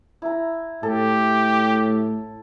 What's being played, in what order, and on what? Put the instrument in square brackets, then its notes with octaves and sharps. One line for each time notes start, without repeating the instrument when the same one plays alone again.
[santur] E4 A#5
[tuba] A2 [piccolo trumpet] G4 [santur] A4